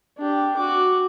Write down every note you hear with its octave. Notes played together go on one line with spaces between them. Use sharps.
D4 G4
F#4 D6